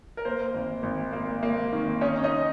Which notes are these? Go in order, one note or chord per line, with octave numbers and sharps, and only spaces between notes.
A#4
A#3 C5
G#1
G#1
A#3
A#3
D#3
C#4 D#4 C#5
D#4 D#5